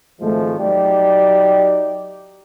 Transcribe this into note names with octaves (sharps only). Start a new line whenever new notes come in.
G#1 F3 G#3 A3
F#3 D#4 G4 D5